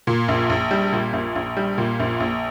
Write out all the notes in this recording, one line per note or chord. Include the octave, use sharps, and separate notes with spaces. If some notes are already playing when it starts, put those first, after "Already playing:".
A#2
A#1
A#1
G3
A#2
A#1
A#1
G3
A#2
A#1
A#1